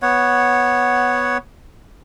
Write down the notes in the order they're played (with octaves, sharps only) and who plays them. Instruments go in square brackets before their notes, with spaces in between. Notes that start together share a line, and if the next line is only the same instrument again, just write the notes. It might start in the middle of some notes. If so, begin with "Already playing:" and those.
[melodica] B3 C#5 F#5